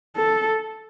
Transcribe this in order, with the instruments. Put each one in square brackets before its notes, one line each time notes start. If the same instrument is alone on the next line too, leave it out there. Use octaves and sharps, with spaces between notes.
[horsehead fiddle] A4